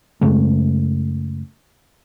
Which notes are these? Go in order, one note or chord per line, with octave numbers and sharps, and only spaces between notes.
F#2 C#3 G#3 A3